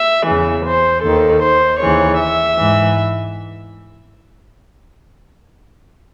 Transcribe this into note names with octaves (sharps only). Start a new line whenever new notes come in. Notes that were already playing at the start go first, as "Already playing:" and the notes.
Already playing: E5
E2 C#3 E3
C5
D#2 D#3 A4
C5
D#2 C#3 E3 C#5
E5
G#2 E3